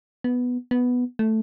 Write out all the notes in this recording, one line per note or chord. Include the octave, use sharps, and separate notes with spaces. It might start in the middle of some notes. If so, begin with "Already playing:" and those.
B3
B3
A3